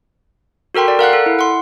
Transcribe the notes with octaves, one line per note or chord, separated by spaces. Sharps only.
F#4 A4 A#4 G5 C6
D5
A#4 F5 F#5 F#6
A4
E4
F#5 C6